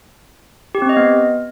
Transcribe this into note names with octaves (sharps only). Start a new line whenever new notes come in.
G4
C4
D#5
B3